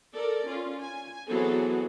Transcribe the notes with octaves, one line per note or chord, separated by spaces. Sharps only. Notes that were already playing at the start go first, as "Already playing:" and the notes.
A4 A#4 D5
C#4 F4
G#5
E3 F#3 B3 C4 G#4 A4